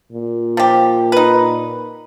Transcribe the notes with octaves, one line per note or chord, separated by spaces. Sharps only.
A#2
F3 G4
D#4 B4